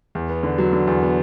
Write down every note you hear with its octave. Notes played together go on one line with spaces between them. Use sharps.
E2
B3
D3
F#3
D3
E2
B3